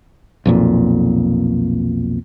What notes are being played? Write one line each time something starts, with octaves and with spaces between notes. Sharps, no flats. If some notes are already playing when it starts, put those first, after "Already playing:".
B1 F2 A#2